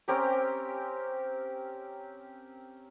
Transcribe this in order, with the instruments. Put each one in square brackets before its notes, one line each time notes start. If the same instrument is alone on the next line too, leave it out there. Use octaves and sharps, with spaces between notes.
[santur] C4 C#4 G4 A#4